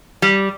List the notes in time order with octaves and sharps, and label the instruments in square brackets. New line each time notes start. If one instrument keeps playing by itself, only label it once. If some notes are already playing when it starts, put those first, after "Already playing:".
[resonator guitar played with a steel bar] G3